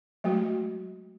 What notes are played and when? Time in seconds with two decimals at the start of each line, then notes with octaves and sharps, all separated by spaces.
0.24 F#3 G#3 A3 F#4